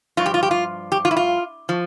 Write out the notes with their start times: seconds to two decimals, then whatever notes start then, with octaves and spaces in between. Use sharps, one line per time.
0.17 G2 F3 F4
0.26 G4
0.34 F4
0.43 G4
0.51 F4
0.92 G4
1.05 F4
1.11 E4
1.16 F4
1.69 F3